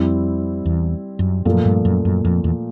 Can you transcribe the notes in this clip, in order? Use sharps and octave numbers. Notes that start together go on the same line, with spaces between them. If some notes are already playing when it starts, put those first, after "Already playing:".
Already playing: F2 G3 C4 E4
E2
F#2
F#2 A#2 F3 A3
G2
F#2
F#2
F2
E2